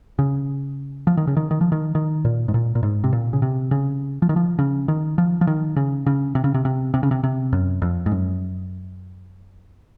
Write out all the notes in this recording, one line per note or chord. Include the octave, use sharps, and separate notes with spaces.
C#3
F3
D#3
C#3
D#3
D#3
F3
D#3
D#3
A#2
G#2
A#2
A#2
G#2
C3
A#2
C#3
C3
C#3
F3
D#3
F3
C#3
D#3
F3
F3
D#3
C#3
C#3
C3
C#3
C3
C3
C3
C#3
C3
C3
F#2
F2
G#2
F#2